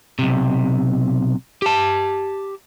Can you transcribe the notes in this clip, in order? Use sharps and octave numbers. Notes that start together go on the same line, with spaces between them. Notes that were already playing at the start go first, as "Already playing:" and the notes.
B1 C3
G4 A5